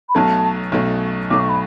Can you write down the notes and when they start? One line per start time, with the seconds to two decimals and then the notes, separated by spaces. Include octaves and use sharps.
0.09 B5
0.15 B1 B2 F#3 A3 A5
0.72 B1 B2 F#3 A3
1.30 B1 B2 F#3 A3 D6
1.39 C#6
1.49 B5